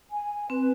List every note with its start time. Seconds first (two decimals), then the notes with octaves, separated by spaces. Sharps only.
0.11 G#5
0.50 C4 B4